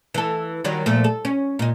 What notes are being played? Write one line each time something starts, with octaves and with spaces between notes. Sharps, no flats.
E3 A4
D#3 F#3 G3
A#2 F3 A3
A4
C#4
A#2 D#4